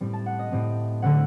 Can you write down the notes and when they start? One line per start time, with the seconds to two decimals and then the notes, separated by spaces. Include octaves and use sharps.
0.01 A2 G3 C4
0.13 A5
0.26 F#5
0.39 D#5
0.52 A2 G3 C4
1.02 D3 A3 C4 F#5